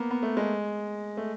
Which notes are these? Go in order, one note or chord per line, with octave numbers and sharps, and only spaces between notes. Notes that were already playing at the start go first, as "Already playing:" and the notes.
Already playing: A#3 B3
B3
A3
G#3
A3